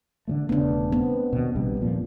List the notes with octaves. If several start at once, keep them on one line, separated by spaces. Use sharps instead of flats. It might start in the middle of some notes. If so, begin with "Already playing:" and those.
D3 F3 A3
E1 C#3 A3 B3 D4
B3 C4
D#2 B2
A#1 C3 G3
D#1 A#2 F3